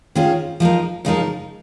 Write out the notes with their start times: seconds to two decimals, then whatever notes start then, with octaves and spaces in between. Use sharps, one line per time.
0.15 G#2 D#3 C#4 F4 G#4
0.60 F3 G#3 D#4 A#4
1.05 C#3 F3 G#3 D#4 A#4